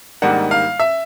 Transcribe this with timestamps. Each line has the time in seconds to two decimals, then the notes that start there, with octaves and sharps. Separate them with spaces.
0.22 G#2 D#3 G3 A#3 D4 F#5
0.51 F5
0.80 E5